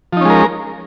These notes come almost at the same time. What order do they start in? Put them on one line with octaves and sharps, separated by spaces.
F3 D#4 C#4 G#3 A#4